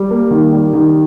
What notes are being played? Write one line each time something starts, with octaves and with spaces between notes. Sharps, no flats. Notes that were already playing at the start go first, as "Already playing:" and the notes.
Already playing: G3
A#3
D#3
G3
D#3